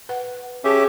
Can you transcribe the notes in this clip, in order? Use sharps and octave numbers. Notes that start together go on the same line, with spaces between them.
B4 F#5
C#4 G4 G#4 E5 A5